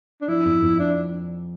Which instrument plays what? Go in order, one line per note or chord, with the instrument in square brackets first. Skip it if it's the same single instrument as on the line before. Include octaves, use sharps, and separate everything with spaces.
[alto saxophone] D4
[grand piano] F3 [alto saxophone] E4
[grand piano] F2
F2
[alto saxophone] D4